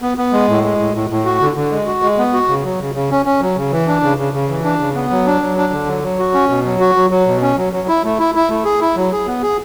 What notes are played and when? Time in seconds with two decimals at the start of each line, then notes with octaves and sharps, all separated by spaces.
0.02 B3
0.18 B3
0.33 G#3
0.48 A2
0.64 G#3
0.79 A2
0.94 A2
1.10 A2
1.25 F#4
1.41 D3
1.56 D3
1.71 G#3
1.86 F#4
2.02 G#3
2.18 B3
2.33 F#4
2.48 C#3
2.64 F#3
2.80 C#3
2.95 C#3
3.11 C#4
3.26 C#4
3.41 F#3
3.57 C#3
3.72 E3
3.87 D4
4.03 C#3
4.18 C#3
4.33 C#3
4.49 E3
4.64 D4
4.80 C#3
4.95 B3
5.11 F#3
5.26 D4
5.42 F#3
5.57 D4
5.72 D3
5.88 F#3
6.03 F#3
6.19 F#4
6.34 C#4
6.49 B2
6.65 F#3
6.80 F#4
6.96 F#3
7.11 F#3
7.26 B2
7.42 C#4
7.57 F#3
7.73 F#3
7.88 E4
8.04 A3
8.19 E4
8.35 E4
8.49 A3
8.65 G#4
8.81 E4
8.96 F#3
9.12 G#4
9.27 B3
9.42 G#4